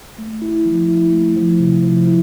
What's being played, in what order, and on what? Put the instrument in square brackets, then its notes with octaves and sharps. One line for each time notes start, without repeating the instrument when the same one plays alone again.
[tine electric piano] A3
E4
F3
E4
A3
F3
C3
F3
E4